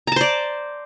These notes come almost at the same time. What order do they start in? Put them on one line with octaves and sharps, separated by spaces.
A#5 A5 C5 D5